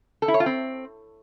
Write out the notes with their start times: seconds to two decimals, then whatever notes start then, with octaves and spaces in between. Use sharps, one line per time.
0.22 A4
0.28 E4
0.34 C#5
0.40 F4
0.46 C4